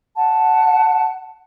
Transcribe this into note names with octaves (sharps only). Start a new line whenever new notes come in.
F#5 A5